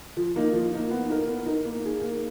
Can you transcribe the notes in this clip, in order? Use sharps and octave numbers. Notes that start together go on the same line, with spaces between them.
F3
A#3 D#4
F3
A#3 D#4
B3
D#4 A#4
B3
D#4 A#4
A#3
D#4 G#4
A#3